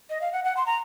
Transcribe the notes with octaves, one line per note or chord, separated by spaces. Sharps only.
D#5
F5
F#5
F#5
C6
A#5